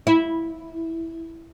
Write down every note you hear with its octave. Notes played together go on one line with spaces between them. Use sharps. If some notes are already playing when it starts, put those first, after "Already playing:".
E4